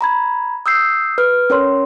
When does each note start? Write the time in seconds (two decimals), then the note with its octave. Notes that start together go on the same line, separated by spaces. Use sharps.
0.01 A#5 B5 G#6
0.66 D#6 E6 G6 C7
1.18 B4 F6
1.50 C#4 A#4 C#5 C6